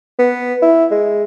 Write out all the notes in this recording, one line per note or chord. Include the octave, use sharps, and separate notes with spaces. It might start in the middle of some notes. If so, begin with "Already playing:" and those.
B3
E4
G#3